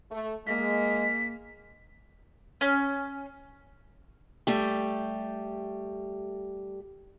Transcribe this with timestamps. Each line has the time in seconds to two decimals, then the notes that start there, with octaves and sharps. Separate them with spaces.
0.11 A3
0.47 G#3 A#3 B6
2.61 C#4
4.47 G3 A3 G4